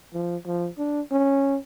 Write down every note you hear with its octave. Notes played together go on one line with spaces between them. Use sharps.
F3
F3
D4
C#4